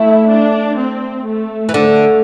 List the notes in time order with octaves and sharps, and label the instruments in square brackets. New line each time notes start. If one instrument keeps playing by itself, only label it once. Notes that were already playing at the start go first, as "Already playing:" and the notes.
Already playing: [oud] A3 [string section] E4
[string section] D4
C4
A3
[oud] E3
[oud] D3 [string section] A3